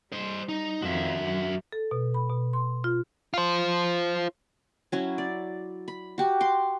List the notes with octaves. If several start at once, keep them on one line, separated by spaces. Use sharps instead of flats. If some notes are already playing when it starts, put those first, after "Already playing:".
G3 C5 D#5
D#4
F2 D#3 F#4 E5
F#2
A4
B2
B5
B2
C6
F4
F4 C5
F#3 C#4 E4
D5
B5
F#4 G4 F#5
C6 D6